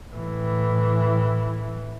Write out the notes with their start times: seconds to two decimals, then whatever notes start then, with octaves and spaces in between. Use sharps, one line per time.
0.12 A2 E3